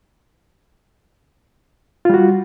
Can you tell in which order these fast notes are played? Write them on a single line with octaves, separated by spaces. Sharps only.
F4 G3 F#4